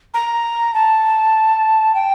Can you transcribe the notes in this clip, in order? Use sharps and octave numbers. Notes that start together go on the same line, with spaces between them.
A#5
A5
G5